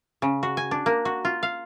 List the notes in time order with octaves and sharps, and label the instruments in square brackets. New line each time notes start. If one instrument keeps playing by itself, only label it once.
[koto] C#3
F#4
G#5
D4
A#3
F#4
F4
F5